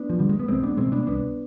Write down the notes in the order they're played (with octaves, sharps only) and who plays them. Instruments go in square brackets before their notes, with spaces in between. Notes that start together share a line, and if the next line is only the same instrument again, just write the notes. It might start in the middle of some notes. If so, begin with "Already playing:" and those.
Already playing: [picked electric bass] B3 D4
F3
D3 G3
G#3
B3
C2 G#3 C4
B3 D4
B2 G#3 C4
B3 D4
C2 B3 D4